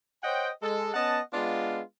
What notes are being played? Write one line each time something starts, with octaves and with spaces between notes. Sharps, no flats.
C5 C#5 D#5 F#5 G5
G#3 A4
B3 C#4 D#5 F#5 A5
G#3 B3 D4 F4